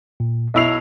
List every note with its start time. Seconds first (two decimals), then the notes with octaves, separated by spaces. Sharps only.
0.20 A#2
0.54 B1 E4 D#5 C#6 C7 F7